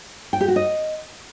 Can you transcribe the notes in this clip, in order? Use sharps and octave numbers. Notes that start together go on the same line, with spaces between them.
G5
G4
F#4
D#5